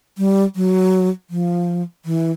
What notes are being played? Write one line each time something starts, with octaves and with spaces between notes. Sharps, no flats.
G3
F#3
F3
E3